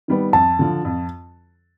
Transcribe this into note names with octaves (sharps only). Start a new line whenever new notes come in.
D#3 G3 B3
F2 A5
D3 F3
F2